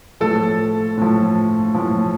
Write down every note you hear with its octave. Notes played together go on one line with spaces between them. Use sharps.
A2 F3 A4
A2 F3
A2 F3